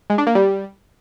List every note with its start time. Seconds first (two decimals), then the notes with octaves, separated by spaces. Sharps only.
0.10 G#3
0.18 D4
0.27 A#3
0.35 G3